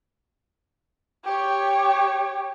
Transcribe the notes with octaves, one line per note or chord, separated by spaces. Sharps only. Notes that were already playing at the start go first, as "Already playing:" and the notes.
G4 C#5